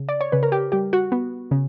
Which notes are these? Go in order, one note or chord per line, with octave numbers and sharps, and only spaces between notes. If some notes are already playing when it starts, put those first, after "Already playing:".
Already playing: C#3
D5
C#5
C#3 B4
A#4
G4
G3 G4
F#4
B3
C#3